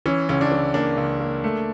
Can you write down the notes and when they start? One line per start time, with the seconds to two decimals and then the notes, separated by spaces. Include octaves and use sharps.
0.06 E3 C#4
0.29 C#2 C#4
0.41 D4
0.52 E3
0.74 A#3 D4
0.97 C#2
1.20 A#3
1.44 A3